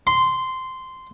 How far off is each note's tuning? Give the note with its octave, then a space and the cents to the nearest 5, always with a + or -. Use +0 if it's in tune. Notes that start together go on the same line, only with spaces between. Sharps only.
C6 -10